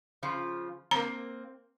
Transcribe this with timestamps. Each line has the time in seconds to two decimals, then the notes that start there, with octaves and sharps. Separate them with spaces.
0.23 C#3 F3 F4
0.91 A#3 C4 A#5